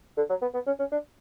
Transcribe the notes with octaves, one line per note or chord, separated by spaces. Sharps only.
D3
F#3
B3
B3
C#4
C#4
D4